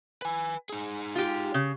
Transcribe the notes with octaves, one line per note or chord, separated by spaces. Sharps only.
B4 G#5
D#4 G#4
F4 G4
C#3